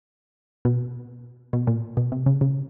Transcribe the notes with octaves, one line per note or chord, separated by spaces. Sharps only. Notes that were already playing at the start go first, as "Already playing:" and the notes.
B2
B2
A#2
B2
C3
C#3
C#3